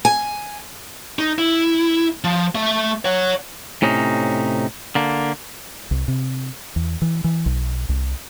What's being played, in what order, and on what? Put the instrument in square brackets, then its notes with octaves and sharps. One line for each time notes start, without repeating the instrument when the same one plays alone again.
[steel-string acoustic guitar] G#5
[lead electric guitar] D#4
E4
F3
A3 E5
C#5 F#5
[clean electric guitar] A2 C3 C#4 D#4
D3 A#3
[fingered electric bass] C2
C3
E2
E3
E3
B1
C2